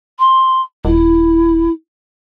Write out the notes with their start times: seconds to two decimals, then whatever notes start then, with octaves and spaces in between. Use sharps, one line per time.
0.19 C6
0.85 D#1 E4